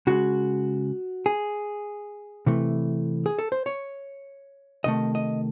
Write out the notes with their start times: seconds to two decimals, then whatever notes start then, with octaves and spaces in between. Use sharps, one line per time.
0.07 C#3 G#3 F#4
1.26 G#4
2.46 C3 E3 A3
3.26 G#4
3.39 A4
3.52 C5
3.66 C#5
4.84 C3 D#3 A3 D#5
5.15 D#5